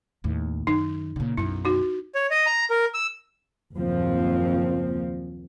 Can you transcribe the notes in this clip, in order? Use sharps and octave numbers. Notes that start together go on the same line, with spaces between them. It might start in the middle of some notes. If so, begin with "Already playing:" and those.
D#2 A2
F#2 D#3 D#4
A#2 C#3
B1 F#2 E4
D#4 F#4
C#5
D#5
A#5
A#4
E6
F#1 D#2 A#2 F3 C4